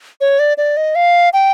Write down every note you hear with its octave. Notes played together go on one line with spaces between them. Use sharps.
C#5
D5
D5
D#5
F5
G5